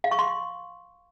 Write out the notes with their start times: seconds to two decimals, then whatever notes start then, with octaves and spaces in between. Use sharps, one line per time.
0.04 F5
0.11 C#6
0.19 C6